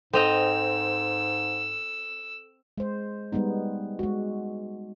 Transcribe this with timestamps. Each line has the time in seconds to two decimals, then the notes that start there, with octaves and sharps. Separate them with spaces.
0.13 G#2 C4 A4 D#5 G5 E6 F7
2.78 G#3 C5
3.32 G3 G#3 B3 D#4
3.99 G#3 F#4